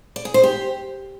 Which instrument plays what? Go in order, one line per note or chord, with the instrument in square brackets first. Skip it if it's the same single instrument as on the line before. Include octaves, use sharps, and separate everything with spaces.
[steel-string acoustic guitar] D5
G#4
C5
G4